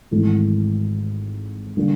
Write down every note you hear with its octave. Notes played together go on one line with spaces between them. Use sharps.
G#1 G#2 E3 A3
D3 G3 A#3